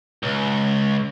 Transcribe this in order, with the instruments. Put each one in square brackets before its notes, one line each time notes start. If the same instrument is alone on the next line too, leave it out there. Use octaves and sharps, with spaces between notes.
[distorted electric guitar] C#2